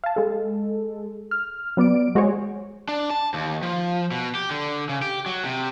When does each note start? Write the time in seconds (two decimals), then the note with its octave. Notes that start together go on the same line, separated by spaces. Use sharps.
0.04 F5 A5
0.16 G#3 A4
1.31 F6
1.77 F#3 B3 D5 D7
2.15 G#3 F#4 G#4 C5 C#5
2.89 D4
3.10 A5
3.34 D#2
3.63 F3
4.11 B2
4.35 G4
4.50 D3
4.89 C#3
5.02 G4
5.26 F#3
5.45 C3